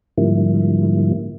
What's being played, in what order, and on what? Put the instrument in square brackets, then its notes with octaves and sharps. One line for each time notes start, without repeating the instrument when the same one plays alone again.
[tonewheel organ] G#2 D3 F3 G3 A#3 E4